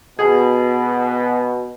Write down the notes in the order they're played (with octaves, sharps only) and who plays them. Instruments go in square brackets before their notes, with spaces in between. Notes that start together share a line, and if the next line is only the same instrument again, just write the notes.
[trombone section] B2 [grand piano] G#4